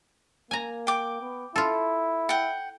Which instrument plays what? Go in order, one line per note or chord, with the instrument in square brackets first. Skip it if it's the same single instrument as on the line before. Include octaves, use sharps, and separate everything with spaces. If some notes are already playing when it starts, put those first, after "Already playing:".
[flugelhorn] A#3 [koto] G#5 A#5
[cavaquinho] G5 D6
[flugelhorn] B3
[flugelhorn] E4 [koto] F4 A4
[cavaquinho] F#5 G5